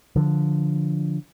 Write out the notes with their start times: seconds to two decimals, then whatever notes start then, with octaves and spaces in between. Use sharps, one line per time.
0.16 D3 F3